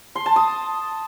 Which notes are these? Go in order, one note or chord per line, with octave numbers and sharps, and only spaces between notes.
C6
A5
D#6